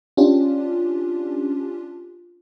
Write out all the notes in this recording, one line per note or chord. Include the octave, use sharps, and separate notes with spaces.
C#4 D4 F4 G4